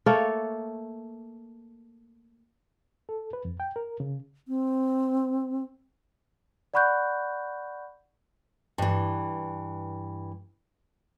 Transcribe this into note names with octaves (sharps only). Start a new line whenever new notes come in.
A3 A#3 A4 C#5
A4
B4
F2
G5
A#4
C#3
C4
D5 F#5 B5 C#6 F#6 G6
G2 E3